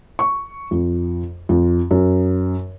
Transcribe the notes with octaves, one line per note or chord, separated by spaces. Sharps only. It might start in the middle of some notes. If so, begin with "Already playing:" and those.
C#6
F2
F2
F#2